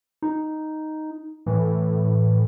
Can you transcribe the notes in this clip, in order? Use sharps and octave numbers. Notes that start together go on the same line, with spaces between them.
D#4
A2 E3